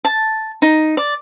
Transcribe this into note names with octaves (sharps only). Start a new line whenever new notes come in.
A5
D#4
D5